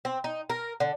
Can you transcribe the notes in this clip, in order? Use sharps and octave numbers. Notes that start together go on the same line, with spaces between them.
C4
D#4
A#4
D3